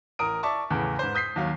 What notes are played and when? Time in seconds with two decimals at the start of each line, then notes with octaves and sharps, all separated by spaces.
0.19 A1 A#4 D#6 D7
0.43 D5 E5 A5 C#6 D6
0.70 E2 A2 C#3 B3
0.99 G#2 B4 C5
1.15 D#6 G6 B6 C7
1.36 D#2 F#3 F5